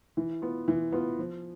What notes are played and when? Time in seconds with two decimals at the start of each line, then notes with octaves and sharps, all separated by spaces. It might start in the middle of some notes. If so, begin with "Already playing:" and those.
0.17 E3
0.42 B3 F4
0.68 E3
0.92 B3 F4
1.19 F3